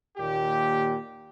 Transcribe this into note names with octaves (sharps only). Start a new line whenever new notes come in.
D#2 A#2 G4